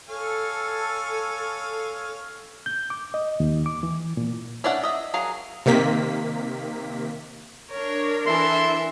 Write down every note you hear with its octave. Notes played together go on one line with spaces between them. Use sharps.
A4 C#5 F5 G#5
G6
D6
D#5
D#2
D6
E3
A#2
C#4 D4 D5 E5 F#5
D#5 E5
F#3 G#4 A#4 F5
C3 D#3 A#3 B6
D4 A#4 C#5
E3 A4 E5 C6